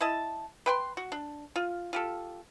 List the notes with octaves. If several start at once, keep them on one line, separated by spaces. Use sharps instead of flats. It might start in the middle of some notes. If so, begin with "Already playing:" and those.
E4 D#5 A5
B4 G5 C6
F#4
D4
F4
F4 G4 A4